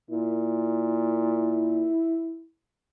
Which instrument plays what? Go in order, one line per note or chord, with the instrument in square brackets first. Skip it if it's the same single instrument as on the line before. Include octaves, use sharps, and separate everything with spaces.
[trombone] A#2 [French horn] E4